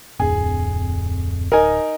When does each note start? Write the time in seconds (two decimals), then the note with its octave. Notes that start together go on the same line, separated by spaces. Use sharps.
0.20 D1 F2 G#4
1.52 D#4 A#4 G#5